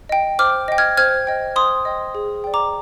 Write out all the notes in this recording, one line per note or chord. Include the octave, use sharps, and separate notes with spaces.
D#5 G5
C5 D6 F6
D#5 G5
F6 G#6
C5 F6 G#6
D#5 G5
C5 C6 D#6
D#5 G5
G#4
D5 G5
A#5 D6